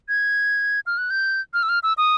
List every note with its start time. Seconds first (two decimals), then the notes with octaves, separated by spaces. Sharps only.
0.09 G#6
0.86 F6
0.98 F#6
1.10 G6
1.54 F6
1.63 E6
1.69 F6
1.83 E6
1.98 D#6